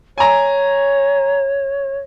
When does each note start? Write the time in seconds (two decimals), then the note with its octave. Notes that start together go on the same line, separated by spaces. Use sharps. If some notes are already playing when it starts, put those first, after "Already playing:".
0.18 C#5 G#5 A#5